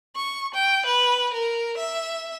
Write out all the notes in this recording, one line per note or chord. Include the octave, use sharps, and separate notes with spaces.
C#6
G5
B4
A#4
E5